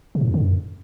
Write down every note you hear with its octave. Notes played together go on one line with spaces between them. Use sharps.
C3
G#2
F2
D3
F#2